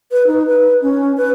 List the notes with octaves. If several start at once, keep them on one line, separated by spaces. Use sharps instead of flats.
B4
D#4
B4
C#4
B4